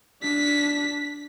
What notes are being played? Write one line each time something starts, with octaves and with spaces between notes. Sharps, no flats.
D4 B6